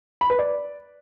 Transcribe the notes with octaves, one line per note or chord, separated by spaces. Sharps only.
B5
B4
D5